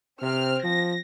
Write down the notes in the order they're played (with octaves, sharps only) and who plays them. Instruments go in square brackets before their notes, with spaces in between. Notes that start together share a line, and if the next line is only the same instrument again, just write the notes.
[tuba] C3 [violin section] C4 F6
[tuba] F3 [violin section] A#6